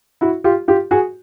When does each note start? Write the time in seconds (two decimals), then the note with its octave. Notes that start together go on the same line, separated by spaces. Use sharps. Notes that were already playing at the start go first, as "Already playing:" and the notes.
0.21 E4 F#4
0.44 F4 G4
0.68 F4 G4
0.91 F#4 G#4